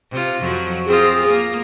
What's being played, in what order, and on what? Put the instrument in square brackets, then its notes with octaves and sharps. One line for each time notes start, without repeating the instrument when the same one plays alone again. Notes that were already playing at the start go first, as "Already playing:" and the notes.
[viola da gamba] C3 F4
F2 F3 F#3
[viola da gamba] C4 F4 A#4 [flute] G#4
[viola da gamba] A#3